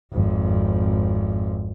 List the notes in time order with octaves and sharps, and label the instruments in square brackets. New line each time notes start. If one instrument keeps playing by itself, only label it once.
[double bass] G#1 F2